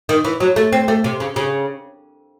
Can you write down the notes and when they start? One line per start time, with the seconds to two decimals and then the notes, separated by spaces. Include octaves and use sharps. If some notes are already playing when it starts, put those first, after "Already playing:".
0.09 D#3
0.25 E3
0.40 F#3
0.56 A3
0.73 C4
0.88 A3
1.04 C3
1.20 C#3
1.36 C#3